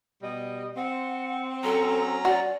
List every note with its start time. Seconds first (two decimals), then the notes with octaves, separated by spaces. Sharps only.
0.23 B2 G3 D#5
0.76 C4 F#5
1.63 F#3 C#4 A4 A#5
2.25 F#4 D5